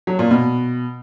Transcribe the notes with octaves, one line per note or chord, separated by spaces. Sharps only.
F#3
A#2
B2